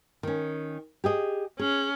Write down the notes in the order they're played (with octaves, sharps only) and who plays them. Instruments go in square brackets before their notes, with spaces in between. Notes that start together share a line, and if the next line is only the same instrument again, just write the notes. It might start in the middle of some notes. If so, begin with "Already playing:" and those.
[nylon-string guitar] D#3 C#4
G4 G#4 D#5
[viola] C#4 [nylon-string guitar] G#4